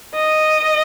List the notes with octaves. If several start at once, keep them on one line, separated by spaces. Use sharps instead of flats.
D#5